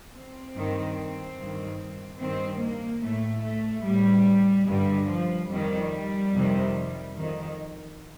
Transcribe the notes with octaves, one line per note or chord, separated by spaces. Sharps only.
C4
G2 D#3
G2 D#3
G2 D#3 C4
A#3
A2 A3
A3
A2 G3
G2 D3 G3
F3
F2 D#3 G3
F2 C3 D#3
F2 D#3